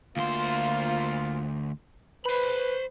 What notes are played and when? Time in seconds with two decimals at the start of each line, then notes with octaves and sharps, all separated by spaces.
0.17 D2 A#3 F4 C5
2.26 B4 C5 B5